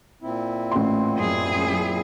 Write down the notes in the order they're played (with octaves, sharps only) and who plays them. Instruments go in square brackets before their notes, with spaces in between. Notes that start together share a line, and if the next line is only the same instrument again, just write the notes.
[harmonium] A#2 C4 E4
[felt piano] A1 C6
[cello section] F#2 G#4